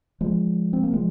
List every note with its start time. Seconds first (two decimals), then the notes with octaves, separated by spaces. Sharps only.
0.21 F3 G#3
0.73 C4
0.83 A#3
0.93 F3 G#3